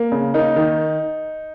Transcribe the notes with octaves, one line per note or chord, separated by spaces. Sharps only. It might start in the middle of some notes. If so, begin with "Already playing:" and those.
Already playing: A#3
C#3
A#3 D#4
D#3